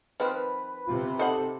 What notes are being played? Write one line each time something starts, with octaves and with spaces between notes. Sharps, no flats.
D#3 F3 C4 B4
C3 F4
D#4 A4 C5 F#5